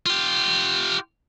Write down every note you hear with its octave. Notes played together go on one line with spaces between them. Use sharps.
F4 G4